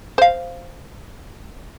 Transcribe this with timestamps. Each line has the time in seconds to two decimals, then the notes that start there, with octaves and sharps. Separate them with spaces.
0.18 C5 F5